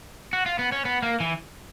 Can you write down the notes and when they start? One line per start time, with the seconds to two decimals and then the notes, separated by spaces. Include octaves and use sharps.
0.33 F#4
0.46 F4
0.59 B3
0.72 C#4
0.85 B3
1.03 A#3
1.20 E3